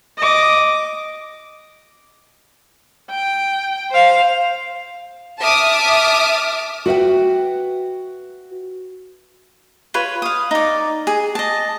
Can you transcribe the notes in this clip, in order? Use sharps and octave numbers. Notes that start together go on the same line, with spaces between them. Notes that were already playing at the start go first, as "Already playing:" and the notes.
D#5 D6
G5
C5 F5
E5 A5 D6 D#6 F6
F#4 B4 E5 G5
F4 B4 C#5
F5 D#6
D#4 D5
G#4
D#5 A5